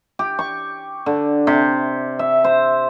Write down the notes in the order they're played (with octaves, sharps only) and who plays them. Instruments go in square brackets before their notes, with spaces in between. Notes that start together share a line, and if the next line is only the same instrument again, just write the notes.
[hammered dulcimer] G4
C#6
D3
C3
E5
C5